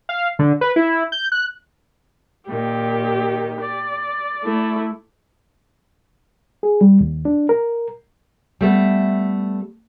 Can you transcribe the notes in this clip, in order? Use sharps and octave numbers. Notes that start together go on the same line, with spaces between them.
F5
D3
B4
E4
G6
F#6
A#2 D#3 G4
D5
A3 E4
G#4
G3
D#2
D4
A#4
G3 A3 B3